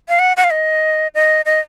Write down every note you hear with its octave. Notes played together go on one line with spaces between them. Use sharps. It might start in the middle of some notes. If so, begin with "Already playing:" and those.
F5
F#5
F#5
F5
D#5
D#5
D#5